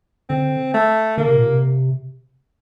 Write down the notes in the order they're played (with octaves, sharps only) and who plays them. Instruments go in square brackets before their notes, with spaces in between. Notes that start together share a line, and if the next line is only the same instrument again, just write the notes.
[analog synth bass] D3 [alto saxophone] C4
[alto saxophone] A3
[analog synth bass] D3 [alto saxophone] A#3
[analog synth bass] C3
A#2
C3